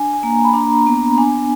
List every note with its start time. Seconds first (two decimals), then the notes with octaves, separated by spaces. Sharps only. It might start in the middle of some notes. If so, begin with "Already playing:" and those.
Already playing: D4 G#5
0.13 G#5
0.23 A#3 A#5
0.44 B5
0.54 D4 A#5
0.86 B3
1.18 D4 G#5